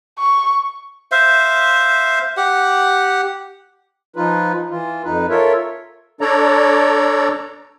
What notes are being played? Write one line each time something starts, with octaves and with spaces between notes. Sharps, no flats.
C#6
C5 E5 F5
G4 F#5
F3 D#4 F4 B4
E3 F4
F2 D#4 B4
F4 A4 A#4 C#5 E5
D4 A4 C#5 D5 A#5